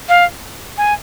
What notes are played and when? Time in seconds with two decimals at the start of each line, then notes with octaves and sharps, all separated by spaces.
0.09 F5
0.78 G#5